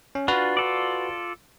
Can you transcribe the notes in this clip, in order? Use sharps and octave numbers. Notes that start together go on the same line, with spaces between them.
C#4
D4 F4 F#4 B4
F4 A4 D5